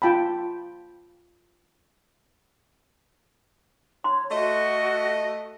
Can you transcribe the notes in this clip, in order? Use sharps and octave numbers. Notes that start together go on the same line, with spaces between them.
F4 G5 A5 B5
C#5 C6
A3 F#4 D#5